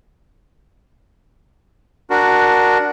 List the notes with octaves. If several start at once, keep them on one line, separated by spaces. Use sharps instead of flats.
D4 F#4 A#4